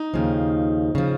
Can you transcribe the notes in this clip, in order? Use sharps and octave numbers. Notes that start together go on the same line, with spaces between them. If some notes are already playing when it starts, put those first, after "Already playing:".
Already playing: D#4
D#2 C#3 F3
C#3 F3